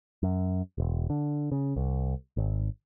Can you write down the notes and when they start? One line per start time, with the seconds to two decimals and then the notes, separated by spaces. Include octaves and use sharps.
0.23 F#2
0.78 E1
1.10 D3
1.52 C#3
1.76 C2
2.37 G#1